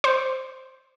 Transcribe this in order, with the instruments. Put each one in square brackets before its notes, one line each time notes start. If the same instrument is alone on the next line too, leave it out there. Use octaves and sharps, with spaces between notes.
[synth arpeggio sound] C5